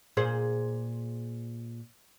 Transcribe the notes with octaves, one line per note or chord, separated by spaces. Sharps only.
A#2 G#4 C5